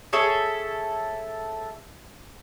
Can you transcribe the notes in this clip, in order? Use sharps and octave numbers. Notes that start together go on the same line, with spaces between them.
G#4 A4 C#5 E5